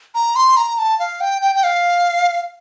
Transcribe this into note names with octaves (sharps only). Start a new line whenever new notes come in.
A#5
C6
A#5
A5
F5
G5
G5
G5
F5